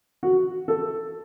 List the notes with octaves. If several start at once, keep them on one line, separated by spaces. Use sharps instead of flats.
F#4
A4